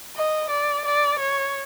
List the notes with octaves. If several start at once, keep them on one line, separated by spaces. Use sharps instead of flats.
D#5
D5
D5
C#5